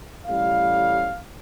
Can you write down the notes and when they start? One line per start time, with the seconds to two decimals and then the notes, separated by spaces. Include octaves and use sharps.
0.26 A1 A2 G3 C#4 F5